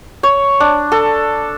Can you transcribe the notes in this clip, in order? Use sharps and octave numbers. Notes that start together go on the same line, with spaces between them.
C#5
D4
A4